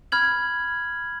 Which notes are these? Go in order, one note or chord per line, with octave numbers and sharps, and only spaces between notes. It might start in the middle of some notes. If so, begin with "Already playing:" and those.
B5 F6 G#6 F#7